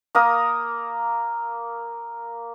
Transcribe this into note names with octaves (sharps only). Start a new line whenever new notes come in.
A#3 A#4 D#6